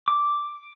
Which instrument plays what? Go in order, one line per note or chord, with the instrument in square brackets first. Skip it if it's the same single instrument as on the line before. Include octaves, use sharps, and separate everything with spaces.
[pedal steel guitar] D6